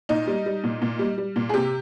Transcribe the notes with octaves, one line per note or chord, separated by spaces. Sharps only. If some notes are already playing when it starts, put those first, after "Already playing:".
A#2 D#4
G3
G3
A#2
A#2
G3
G3
A#2
G#4
C3 G4